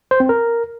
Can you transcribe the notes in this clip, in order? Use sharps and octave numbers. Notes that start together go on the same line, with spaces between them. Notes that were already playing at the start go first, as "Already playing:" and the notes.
C5
C4
A#4